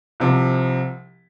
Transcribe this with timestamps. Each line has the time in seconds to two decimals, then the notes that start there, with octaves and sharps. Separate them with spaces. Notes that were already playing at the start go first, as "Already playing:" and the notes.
0.20 C2 C3 F3